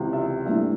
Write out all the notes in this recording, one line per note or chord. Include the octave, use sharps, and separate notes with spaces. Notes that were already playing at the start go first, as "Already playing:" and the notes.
Already playing: C#2 C3 E3
E5
G2 E3 A3 D4 E5